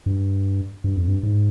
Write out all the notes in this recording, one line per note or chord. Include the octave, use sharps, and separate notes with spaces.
G2
G2
F2
G2
G#2